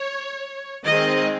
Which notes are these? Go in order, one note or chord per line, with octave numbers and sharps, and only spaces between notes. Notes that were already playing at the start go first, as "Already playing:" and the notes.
Already playing: C#5
D#3 G#3 C4 D#5